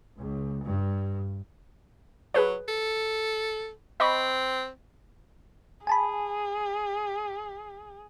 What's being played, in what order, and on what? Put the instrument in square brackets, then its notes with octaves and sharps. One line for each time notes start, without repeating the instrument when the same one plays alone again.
[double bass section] C#2
G2
[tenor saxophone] F#3 [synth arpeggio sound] G#4 B4 C#5
[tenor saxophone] A4
[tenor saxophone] C4 [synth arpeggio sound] D#5 B5 C#6
[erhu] G#4 [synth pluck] G#5 A5 B5